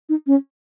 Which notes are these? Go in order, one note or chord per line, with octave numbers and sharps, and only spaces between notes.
D#4
C#4